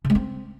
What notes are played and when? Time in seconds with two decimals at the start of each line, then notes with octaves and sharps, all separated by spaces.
0.05 C#3
0.10 G#3
0.15 C4